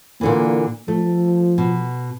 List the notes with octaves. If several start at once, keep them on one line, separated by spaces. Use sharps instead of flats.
A#2 D3 E3 A#3
F3 A3
B2